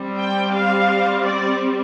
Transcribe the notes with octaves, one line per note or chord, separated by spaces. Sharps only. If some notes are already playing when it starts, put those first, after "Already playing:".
Already playing: G3 C4
G5
F5
D5